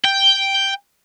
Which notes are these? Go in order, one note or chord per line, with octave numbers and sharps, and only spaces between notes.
G5